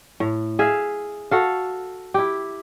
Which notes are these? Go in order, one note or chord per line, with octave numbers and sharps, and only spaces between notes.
A2
G#4 E5 F5
F#4 A4 F5
E4 G4